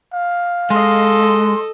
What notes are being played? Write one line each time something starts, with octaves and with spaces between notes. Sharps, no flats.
F5
G#3 A4 D#5 C6